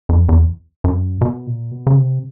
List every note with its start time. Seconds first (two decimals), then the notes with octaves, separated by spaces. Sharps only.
0.09 F2
0.29 E2
0.84 F#2
1.21 B2
1.47 A#2
1.71 B2
1.87 C#3
1.97 C3